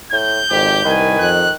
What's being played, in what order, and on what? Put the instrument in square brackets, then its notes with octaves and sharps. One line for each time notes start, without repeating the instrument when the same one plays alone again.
[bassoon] A2 [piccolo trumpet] G6
[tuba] G#1 [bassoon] F2 [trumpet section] G4
[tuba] C2 [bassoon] D#3 [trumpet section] B4 G#5
[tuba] F2 [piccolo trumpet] F#6